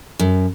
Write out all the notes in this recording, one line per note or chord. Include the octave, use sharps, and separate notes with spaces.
F#2